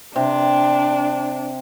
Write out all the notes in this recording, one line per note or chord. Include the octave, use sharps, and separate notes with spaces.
C3 D4